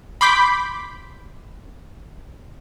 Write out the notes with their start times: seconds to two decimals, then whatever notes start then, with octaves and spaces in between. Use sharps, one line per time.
0.21 B5 C6 D6 G6 B6